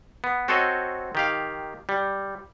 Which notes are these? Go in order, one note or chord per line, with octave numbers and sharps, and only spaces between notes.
B3
C4 F#4 A4 C5 C#5 D#5
D#3 G4 F5
G3